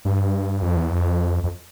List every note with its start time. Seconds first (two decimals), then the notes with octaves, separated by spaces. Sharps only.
0.05 G2
0.62 F2
0.76 E2
0.91 F2
1.43 F2